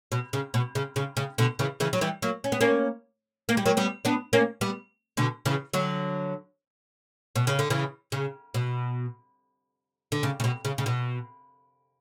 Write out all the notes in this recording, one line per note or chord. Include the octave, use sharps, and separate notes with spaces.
B2
C#3
B2
C#3
C#3
C#3
B2 D3
C#3 E3
C#3 E3
F#3
E3 G3
F#3 A#3
C#4
B3
A#3 C#4
A#3
G3
F#3 A#3
G3 B3
B3 D4
A#3 C#4
G3 B3
B2 D3
C#3 E3
D3 F#3
B2
C#3
D3
C#3 E3
C#3
B2
D3
C#3
C#3
B2
C#3
C#3
B2